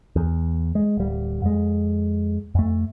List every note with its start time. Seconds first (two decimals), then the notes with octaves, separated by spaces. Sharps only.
0.16 E2
0.75 G#3
0.97 D1 G3
1.42 F2 G#3
2.55 F2 A3